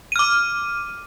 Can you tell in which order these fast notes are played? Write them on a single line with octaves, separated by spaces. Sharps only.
D#7 F6 D6